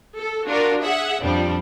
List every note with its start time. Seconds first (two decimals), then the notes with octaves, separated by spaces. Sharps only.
0.18 A4
0.47 D4 F4 F#4 A#4
0.83 G#4 E5 F#5
1.23 F2 F3 G3 D4